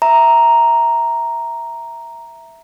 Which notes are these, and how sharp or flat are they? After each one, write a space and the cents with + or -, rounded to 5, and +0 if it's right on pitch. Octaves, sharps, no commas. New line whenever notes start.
E5 +0 A#5 +0